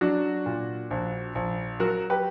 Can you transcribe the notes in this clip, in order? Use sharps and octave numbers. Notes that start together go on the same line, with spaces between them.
F#3 D4 F#4
A#2
A#1
A#1
F#3 F#4 A#4
G4 B4